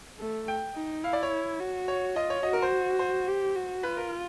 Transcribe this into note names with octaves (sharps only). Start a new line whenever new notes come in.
A3
G5
D#4
E4 F5
D5
C#5
F#4
C#5
F4 D#5
C#5
F#4 D#5
A#4
C5
C5
G4
F#4
F4 B4
A#4